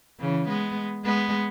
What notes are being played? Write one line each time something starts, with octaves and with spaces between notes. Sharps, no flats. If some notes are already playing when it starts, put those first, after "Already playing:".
C#3 E3
G#3 B3
G#3 B3